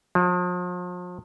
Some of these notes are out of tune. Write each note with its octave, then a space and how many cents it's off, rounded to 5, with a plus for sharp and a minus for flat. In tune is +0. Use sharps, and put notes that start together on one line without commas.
F3 +40